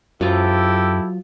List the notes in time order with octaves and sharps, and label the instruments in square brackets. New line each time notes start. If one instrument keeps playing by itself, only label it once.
[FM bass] F#2 [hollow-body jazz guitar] F#3 F4 [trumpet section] E4 G4 A4